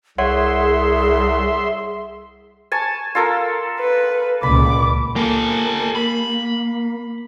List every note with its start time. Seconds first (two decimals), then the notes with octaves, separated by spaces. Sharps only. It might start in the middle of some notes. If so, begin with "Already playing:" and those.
0.18 C2 G#4 C#5 E5 F#5 C6
2.72 G#5 A5 C#6
3.15 F4 A4 A#4
3.79 B4
4.43 C#2 A#2 B5 D6
5.16 A#3 G4 A4
5.95 B5